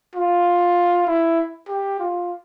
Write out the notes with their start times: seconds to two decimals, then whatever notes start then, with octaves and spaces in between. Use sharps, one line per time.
0.16 F4
1.07 E4
1.69 G4
2.00 F4